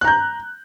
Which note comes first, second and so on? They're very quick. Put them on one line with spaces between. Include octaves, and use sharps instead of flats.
F#6 A#5 G6